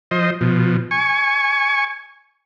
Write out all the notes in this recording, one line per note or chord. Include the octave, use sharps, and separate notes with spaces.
F3 C5 D#5
B2 F3
G#5 C#6